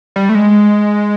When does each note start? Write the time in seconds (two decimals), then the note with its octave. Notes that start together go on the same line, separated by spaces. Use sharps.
0.16 G3
0.29 A3
0.35 G#3